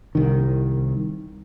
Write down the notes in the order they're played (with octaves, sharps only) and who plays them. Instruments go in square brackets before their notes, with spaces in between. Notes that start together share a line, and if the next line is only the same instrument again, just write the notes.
[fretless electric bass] C2 D#3